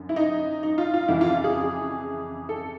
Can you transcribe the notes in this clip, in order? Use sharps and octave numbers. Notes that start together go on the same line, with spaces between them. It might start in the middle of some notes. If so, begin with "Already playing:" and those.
Already playing: F#2 D3
E4
D#4
D#4
F4
F4
F2 C#3 E3 E4
F4
G#4
A4